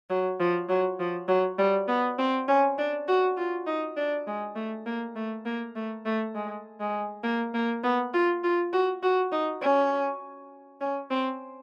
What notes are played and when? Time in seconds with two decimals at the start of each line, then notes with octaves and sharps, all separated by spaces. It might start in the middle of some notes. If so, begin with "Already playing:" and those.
0.10 F#3
0.40 F3
0.70 F#3
1.00 F3
1.29 F#3
1.59 G3
1.88 B3
2.19 C4
2.48 C#4
2.78 D4
3.08 F#4
3.37 F4
3.67 D#4
3.97 D4
4.27 G#3
4.56 A3
4.87 A#3
5.16 A3
5.46 A#3
5.76 A3
6.06 A3
6.35 G#3
6.80 G#3
7.24 A#3
7.54 A#3
7.84 B3
8.14 F4
8.44 F4
8.73 F#4
9.03 F#4
9.32 D#4
9.62 C#4
10.81 C#4
11.11 C4